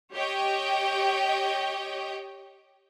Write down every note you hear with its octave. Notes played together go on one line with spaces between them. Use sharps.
G4 C#5 D#5 G5